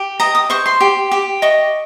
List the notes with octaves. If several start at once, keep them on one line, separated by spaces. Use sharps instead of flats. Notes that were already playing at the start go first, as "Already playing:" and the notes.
Already playing: G4
D#5 A#5
D#6
C5 C#6
C6
G4
G4
D#5 C#6